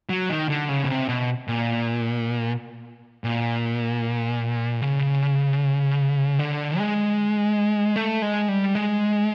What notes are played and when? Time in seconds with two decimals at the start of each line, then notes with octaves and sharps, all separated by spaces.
0.09 F#3
0.30 D#3
0.49 D3
0.69 C#3
0.84 B2
0.89 C3
1.09 B2
1.48 A#2
3.24 A#2
4.81 C#3
6.39 D3
6.78 G#3
7.96 A3
8.22 G#3
8.48 G3
8.75 G#3